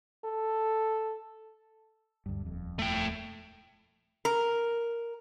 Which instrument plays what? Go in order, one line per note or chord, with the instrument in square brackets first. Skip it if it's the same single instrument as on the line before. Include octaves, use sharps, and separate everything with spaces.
[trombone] A4
[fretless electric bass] D2 G2
D#1 F2
[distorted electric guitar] A3 G5
[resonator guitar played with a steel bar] A#4